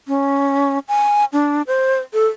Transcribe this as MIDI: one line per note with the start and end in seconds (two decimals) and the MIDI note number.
0.08 0.79 61
0.88 1.25 80
1.33 1.62 62
1.67 1.99 72
2.14 2.26 69